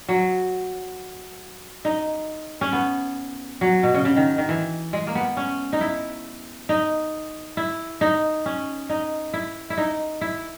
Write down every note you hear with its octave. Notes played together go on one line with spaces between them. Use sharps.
F#3
D#4
C#4
B3
F#3
B2
C#3
C#3
D#3
D#3
E3
G#3
A#3
B3
C#4
D#4
E4
D#4
E4
D#4
C#4
D#4
E4
E4
D#4
E4